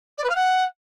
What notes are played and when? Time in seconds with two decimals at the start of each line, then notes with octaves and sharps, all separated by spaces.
0.18 D5
0.24 B4
0.29 F5
0.35 F#5